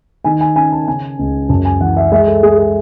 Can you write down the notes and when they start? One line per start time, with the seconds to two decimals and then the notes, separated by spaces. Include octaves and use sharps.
0.24 D#3 G#5
0.41 G#5
0.56 C#4 G#5
0.72 A5
0.87 C#3 G#5
1.19 C#2
1.49 F#2 A5
1.65 G#5
1.80 E3 F#5
1.97 E5
2.11 G#3 E5
2.27 A4
2.43 G#3 G#4
2.58 G#4